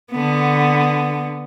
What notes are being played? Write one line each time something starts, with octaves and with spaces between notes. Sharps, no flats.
D3 B3